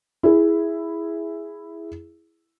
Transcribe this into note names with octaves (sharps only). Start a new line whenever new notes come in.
E4 G#4